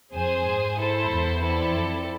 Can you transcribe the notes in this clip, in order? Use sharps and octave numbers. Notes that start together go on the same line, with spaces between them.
F2 G#4 C5 G#5
G#2
E4 A4 C5
E2
C4 E4 A4 D5
F2